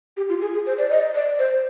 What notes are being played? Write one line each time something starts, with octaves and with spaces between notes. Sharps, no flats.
G4
F4
G#4
G#4
C5
D5
D#5
D5
C5